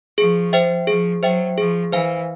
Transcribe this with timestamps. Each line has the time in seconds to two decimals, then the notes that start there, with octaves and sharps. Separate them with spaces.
0.18 F3 G#4
0.53 C5 E5 G5
0.87 F3 G#4
1.23 F#3 C5 E5 G5
1.57 F3 G#4
1.92 E3 C5 F5 G#5